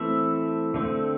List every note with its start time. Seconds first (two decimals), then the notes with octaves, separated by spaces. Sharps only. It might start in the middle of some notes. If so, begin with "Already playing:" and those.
Already playing: E3 A3 C4 E5
0.74 D3 A3 C4